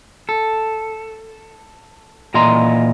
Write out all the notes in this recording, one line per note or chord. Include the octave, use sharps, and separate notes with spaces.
A4
A#2 E3 D#5 A#5 C6